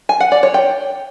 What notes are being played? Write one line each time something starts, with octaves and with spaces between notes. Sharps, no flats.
G#5
F#5
D5
C#5
G5